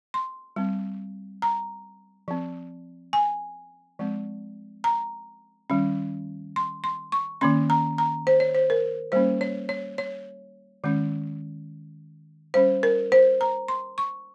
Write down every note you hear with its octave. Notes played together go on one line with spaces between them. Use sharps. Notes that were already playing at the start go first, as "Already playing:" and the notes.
C6
G3 C4
A#5
F3 C4
G#5
F3 G#3 C4
A#5
D#3 G3 C#4
C6
C6
C#6
D#3 A#3 C#4 C6
A#5
A#5
C5
C#5
C5
A#4
G3 A#3 C#4 C5
C#5
C#5
C#5
D#3 G#3 C#4
G3 C#4 C5
A#4
C5
A#5
C6
C#6